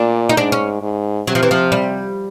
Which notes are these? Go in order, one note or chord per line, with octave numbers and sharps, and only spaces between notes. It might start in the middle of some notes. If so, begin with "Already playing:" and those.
Already playing: A#2 D4
D#4
G#2 D4
C#4
G#2
C3 F#3
F3
E3
F3
G3